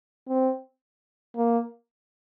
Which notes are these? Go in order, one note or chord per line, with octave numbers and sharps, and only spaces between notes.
C4
A#3